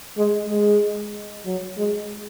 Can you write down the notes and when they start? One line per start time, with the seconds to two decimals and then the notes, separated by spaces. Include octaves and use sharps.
0.18 G#3
0.50 G#3
1.45 F#3
1.78 G#3